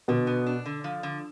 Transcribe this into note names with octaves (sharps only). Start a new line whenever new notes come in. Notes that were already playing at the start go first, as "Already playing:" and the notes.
B2 D3
B3
D4
D3
F3
D3